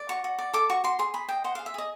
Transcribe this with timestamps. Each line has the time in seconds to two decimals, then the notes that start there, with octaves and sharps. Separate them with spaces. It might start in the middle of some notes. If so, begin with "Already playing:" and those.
Already playing: D5
0.09 F#4 C#6
0.24 F#4
0.39 D5
0.53 A4 D6
0.70 F#4 C#6
0.84 F#4 C6
0.99 G#4 C6
1.14 G#4 B5
1.29 D#5 G5
1.44 C5 F#5
1.55 G#4 F5
1.66 E5
1.74 G#4 D#5